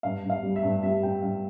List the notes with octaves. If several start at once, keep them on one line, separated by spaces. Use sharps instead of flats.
G2 F5
G2
F5
G3
E5
G2
G3 E5
G3 G5
G2 F5